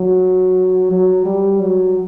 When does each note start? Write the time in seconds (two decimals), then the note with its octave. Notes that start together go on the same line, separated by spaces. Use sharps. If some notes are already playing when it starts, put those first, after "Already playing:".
Already playing: F#3
0.91 F#3
1.25 G3
1.60 F#3